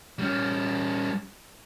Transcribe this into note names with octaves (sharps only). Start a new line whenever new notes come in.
G3 C#4